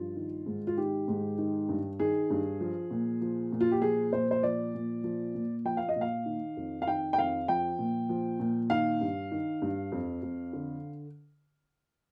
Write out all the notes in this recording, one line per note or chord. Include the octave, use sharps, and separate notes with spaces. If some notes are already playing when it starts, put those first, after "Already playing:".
Already playing: G2 F3 F4
D#3
G#2
F4
D#3 G4
G#2
D#3
G2
D#3 G#4
G2
F3
A#2
F3
A#2
F4
G4
F3 G#4
A#2 C5
C5
F3 D5
A#2
F3
A#2
F3 G5
F5
D#5
A#2
F5
D#3
F2
F5
D#3 G5
G5
F2 F5
F3 G5
A#2
F3
A#2
D#3 F5
G2
D#3
G2
F2
F2
D3